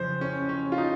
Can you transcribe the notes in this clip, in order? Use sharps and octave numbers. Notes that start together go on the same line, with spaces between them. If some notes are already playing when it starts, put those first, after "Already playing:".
Already playing: F2 C#3 F#3 C5
C#4
C#4
F4
D#4